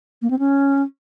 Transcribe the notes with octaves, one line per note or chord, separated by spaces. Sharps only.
A#3
C4
C#4